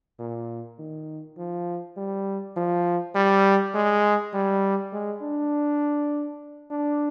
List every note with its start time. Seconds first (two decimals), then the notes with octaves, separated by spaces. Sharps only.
0.19 A#2
0.79 D#3
1.38 F3
1.97 G3
2.56 F3
3.15 G3
3.74 G#3
4.34 G3
4.93 G#3
5.22 D4
6.70 D4